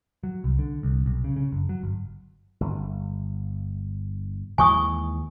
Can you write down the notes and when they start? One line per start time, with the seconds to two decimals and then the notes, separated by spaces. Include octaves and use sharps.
0.24 F#3
0.44 C2
0.59 D3
0.83 C2
1.06 B1
1.24 C#3
1.36 C#3
1.52 F#1
1.69 F#3
1.83 G1
2.61 G1
4.58 D#2 E3 G#3 G#5 C#6 D#6